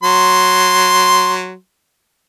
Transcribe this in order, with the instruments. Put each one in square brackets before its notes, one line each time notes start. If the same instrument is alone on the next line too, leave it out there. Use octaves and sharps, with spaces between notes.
[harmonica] F#3 C6